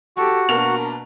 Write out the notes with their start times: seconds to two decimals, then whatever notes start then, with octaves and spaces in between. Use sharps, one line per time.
0.17 F#4 G4 A4
0.49 B2 A#3 D4 A#4 F7